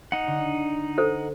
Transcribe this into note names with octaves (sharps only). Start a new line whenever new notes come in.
D#4 F#5
D3
A4 C5